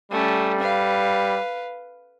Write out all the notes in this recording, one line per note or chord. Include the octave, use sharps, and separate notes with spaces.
G3 A3 C#4
B4 F5